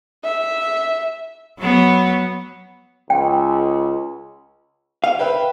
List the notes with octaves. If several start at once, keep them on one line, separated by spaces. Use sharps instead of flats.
E5
F#3 B3
C#2 G5
F5
B4 E5 G5